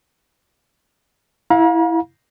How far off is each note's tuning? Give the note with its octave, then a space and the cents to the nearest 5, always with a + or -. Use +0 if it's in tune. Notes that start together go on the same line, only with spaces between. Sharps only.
E4 +0 F5 +35 A#5 +45